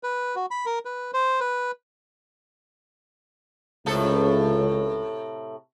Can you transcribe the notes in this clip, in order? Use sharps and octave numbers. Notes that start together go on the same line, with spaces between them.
B4
F#4
B5
A#4
B4
C5
B4
C#2 A2 C3 A4